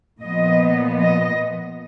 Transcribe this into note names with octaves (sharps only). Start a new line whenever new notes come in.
A#2 F3 B3 D#5
D#5